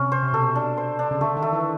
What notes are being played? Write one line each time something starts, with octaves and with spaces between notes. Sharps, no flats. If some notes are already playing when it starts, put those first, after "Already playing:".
Already playing: C3 C#4
C5
C3
B2 A4
C3
D4
C5
D4
C#3
D3 A3
D#3
A3
E3